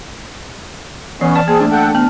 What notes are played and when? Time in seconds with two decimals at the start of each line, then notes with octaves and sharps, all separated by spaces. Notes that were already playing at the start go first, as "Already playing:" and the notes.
1.21 E3 B3 C#4
1.35 D5 A5 F6
1.48 A#3 C4 G#4
1.60 A3 D4
1.72 A4 F#5 G5
1.95 C3 B3 F6